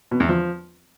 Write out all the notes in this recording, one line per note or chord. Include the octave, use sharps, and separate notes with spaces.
B2
E2
F3